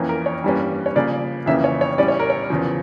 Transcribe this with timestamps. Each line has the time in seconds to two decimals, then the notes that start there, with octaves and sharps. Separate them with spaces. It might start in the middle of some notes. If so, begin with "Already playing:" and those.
Already playing: F2 E3 A#3 C#4
0.09 A#4
0.26 C#5
0.44 G2 E3 G3 A#3 C#4
0.86 C#5
0.96 C#3 F3 A#3 D5
1.46 F2 C#3 E3 A#3 C#4 E5
1.64 C#5
1.81 C#5
1.98 A2 G3 C#4 D5
2.08 C#5
2.19 A#4
2.30 C#5
2.50 E2 C#3 F3